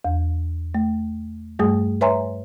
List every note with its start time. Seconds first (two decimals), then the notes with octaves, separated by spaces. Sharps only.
0.05 E2
0.75 A3
1.59 G2 G3 A3 G#4 D#6
2.01 B4 C#5 E5 G#5 A#5 C6